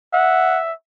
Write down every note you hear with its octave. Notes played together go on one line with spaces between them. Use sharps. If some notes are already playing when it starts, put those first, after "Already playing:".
E5 F#5